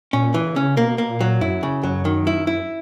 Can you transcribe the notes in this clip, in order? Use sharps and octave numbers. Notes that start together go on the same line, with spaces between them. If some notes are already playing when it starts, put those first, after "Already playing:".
A#2 C#4
E3
C#3
C#4
B2 A#3
A#3
A#2
F#3
F#2 E4
C#3
F#2 F#3
D#3
E4
E4